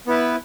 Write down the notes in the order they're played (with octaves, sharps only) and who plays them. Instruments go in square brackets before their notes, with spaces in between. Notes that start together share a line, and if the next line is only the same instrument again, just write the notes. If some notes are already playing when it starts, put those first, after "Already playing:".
[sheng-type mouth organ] B3 E4 B4